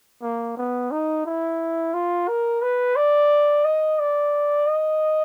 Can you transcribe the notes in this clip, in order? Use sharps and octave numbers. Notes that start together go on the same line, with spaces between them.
A#3
B3
D#4
E4
F4
A#4
B4
D5
D#5
D5
D#5